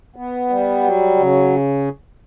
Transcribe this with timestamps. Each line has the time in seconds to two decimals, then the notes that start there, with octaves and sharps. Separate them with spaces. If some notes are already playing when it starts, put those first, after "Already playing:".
0.16 B3
0.50 G3
0.83 F#3
1.17 C#3